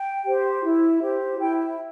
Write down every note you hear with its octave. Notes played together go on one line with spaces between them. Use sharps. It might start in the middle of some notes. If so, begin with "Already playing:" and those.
Already playing: G5
G4 C5
E4
G4 C5
E4 G5